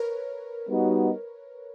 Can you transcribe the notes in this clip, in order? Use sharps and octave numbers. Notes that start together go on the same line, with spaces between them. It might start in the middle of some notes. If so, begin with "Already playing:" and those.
Already playing: A#4 B4 C#5
G3 B3 D#4 F#4